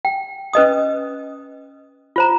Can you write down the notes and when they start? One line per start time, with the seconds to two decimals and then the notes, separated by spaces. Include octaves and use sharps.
0.05 G5
0.53 C#4 B4 D#5 D#6
2.16 F4 C5 A#5